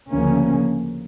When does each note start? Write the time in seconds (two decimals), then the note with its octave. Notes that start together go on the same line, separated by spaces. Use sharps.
0.11 D2 C#3 F3 A#3 C#4